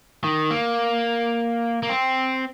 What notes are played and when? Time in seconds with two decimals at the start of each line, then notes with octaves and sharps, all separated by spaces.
0.24 D#3
0.51 A#3
1.83 A#3
1.89 C4